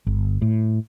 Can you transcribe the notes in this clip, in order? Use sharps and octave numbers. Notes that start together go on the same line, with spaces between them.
G1
A2